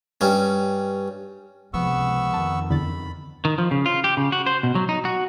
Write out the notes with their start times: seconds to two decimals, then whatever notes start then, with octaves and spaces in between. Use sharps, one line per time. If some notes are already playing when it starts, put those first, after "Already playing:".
0.21 G2 C#4
1.74 C#2 C3 F3 G#3 B3 C#6 E6
2.34 F2 D#3 A5
2.70 E2 D3 B5 A6
3.45 D#3
3.58 F3
3.71 C#3
3.86 F4
4.04 G4
4.17 C#3
4.32 F#4
4.46 C5
4.63 B2
4.75 F#3
4.89 D#4
5.05 F#4